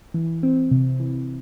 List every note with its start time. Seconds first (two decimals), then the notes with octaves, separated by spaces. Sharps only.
0.14 E3
0.43 C4
0.71 C3
1.00 E3